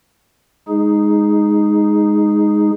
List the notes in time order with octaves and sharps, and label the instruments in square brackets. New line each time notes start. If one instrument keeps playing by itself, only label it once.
[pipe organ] G#3 D#4 G#4